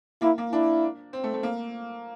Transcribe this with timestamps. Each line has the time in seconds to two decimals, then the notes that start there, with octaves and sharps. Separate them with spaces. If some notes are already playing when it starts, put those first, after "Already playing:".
0.22 A#3 E4
0.38 A#3
0.53 D4 E4
1.13 C4
1.24 A3
1.34 A3
1.43 A#3